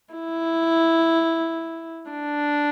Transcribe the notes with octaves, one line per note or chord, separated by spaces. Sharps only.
E4
D4